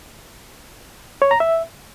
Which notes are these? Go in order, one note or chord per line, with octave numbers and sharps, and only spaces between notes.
C#5
A#5
E5